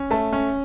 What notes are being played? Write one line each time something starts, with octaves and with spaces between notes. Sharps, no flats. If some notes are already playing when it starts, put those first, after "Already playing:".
Already playing: C#4
A3 A5
C#4